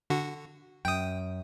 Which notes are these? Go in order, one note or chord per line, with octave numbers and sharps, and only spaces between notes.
D3 F#4
F#2 G5 D#6